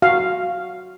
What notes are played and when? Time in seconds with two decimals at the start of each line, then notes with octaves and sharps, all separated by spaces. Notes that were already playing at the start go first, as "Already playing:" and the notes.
0.02 F#4 F5